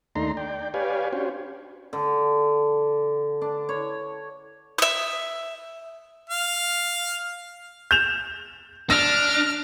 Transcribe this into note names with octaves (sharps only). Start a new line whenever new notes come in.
D#2 A3 D4 D#4 A#5 C6
D5 G5
G4 B4 C#5 D5 F5 G#5
C#4 D4 F#4 G4 C5 C#5
D3
D4
C#5
E5 D#6
F5
G6 E7 F7
D4 F6 A#6